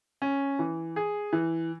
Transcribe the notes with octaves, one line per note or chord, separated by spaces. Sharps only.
C#4
E3
G#4
E3